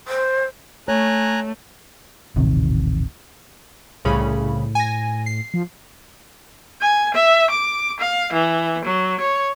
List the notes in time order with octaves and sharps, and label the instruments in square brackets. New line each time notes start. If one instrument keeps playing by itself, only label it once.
[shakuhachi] C5
[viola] A3 [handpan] C#5 [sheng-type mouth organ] G#5 A#5 F#6
[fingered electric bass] D#1 A1 C3 D#3
[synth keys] C2 C#3 B5 [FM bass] A2
[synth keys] G#5 A#6
C7
[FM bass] F3
[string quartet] G#5
E5
D6
F5
E3
F#3
C#5